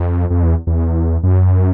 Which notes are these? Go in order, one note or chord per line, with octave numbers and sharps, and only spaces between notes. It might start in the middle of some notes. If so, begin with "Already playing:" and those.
Already playing: F2
F2
E2
E2
F#2